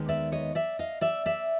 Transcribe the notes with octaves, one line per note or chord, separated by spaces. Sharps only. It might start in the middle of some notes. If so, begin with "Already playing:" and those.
Already playing: D#2 D#3 G#3 B3
D5 E5
C#5 D#5
D5 E5
D#5 F5
D5 E5
D5 E5